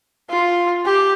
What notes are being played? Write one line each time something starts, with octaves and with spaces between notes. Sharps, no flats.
F4
G4